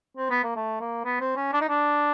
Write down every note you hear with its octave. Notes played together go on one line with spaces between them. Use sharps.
C4
B3
A#3
A3
A#3
B3
C4
C#4
D4
D#4
D4